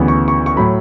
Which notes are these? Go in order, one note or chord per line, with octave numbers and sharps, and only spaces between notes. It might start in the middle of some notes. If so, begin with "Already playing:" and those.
Already playing: D2 C#3 E3 B3
C#6
C#6
C#6
A2 F#3 B5